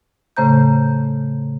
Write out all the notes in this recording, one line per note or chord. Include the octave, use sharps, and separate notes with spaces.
A2 C#3 A3 C5 A#5 G6